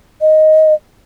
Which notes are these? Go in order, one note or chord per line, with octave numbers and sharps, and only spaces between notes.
D#5